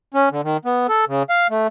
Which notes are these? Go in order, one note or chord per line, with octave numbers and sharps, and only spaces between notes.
C#4
D3
D#3
B3
A4
C#3
F5
A3